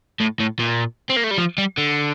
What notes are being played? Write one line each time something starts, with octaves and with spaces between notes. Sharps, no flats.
A2
A2
A#2
C4
A#3
A3
G3
F3
G3
D3